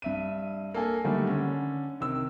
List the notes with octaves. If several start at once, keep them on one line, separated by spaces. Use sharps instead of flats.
G2 E5 D#7
A#3 A4 G#5
D3 D#3 F#3 G3 A3 A#3
D3 C#4
C3 D#3 E6